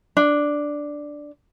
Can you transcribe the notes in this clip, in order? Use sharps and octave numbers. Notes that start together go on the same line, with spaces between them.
D4